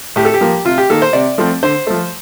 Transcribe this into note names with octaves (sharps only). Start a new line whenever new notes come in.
A2 G4
A4
G4
F3 A#3
C3 F4
G4
D#3 A#3 A4
C5
C3 D5
F3 A3 C4
D3 C5
F3 A3